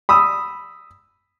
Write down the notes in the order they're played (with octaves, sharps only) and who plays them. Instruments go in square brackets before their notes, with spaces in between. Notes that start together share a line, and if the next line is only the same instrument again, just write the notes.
[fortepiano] B5 D#6 E6